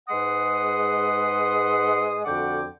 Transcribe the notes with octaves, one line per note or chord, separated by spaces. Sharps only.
G#2 G#3 B4 F#5 C6 D#6
F2 D3 F#4 F#5 G5 D6